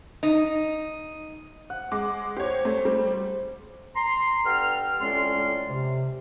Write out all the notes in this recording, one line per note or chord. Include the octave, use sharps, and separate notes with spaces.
D#4
F#5
G#3 D6
G4 C5 C#5
A3 C5
G3
A#5 C6
G2 B3 A4 G5 F6
F2 A2 G#3 C#4 D5 C6
C3